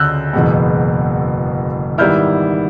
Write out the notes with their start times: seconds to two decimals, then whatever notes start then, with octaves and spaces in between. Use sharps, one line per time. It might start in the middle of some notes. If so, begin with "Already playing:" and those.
Already playing: D2 C#3 E6 F#6 G6
0.33 F#1 E2 B2 G#3 B3
1.98 G#2 D#3 G3 B3 E4 F6 G6